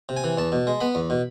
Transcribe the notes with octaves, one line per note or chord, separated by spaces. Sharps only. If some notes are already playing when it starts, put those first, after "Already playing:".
C3
G#5
E3
E2 A5
B2
G#3
B3 B5
E2
B2